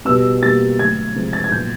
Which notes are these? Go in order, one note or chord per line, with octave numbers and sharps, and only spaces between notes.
B2 G3 B3 E6
B2 G3 A#3 A6
D3 F#3 A3 G#6
C3 F3 G#3 C4
A6
G#6
A#2 F#3 B3 G6